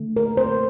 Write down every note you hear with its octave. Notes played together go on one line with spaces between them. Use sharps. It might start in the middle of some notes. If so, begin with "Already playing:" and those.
Already playing: D3 A3
A#4
C5